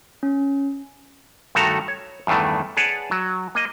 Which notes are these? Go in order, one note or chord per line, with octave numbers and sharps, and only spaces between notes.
C#4
G2 D#3 A3 F#4 A4 A#5
C#5
E2 G2 D#3 E3 A3
G#4 B4 C#5 D5 F#5 A5
F#3
A#3 D#5